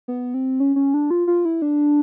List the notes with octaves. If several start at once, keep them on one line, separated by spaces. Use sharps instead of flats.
B3
C4
C#4
C#4
D4
F4
F4
E4
D4